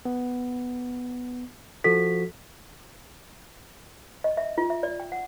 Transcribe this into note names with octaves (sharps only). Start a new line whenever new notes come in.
B3
F3 F#4 A4 B6
D#5
E5
F4
E5
D5
G5
F#5